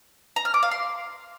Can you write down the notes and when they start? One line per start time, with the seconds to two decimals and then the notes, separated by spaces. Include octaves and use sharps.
0.36 A#5
0.45 F6
0.54 D6
0.63 F5
0.71 C6